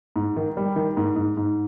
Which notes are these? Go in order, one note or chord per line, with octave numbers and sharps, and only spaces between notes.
G#2
D#3
G3
D#3
G#2
G#2
G#2